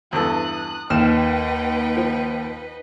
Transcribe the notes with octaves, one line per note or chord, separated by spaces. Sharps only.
E2 G2 A4 D#6 F#6
D#2 D#4 B4 F#5 G5 F6 E7
F3